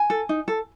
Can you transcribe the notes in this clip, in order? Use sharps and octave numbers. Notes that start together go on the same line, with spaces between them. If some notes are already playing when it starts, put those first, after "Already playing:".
Already playing: G#5
A4
D#4
A4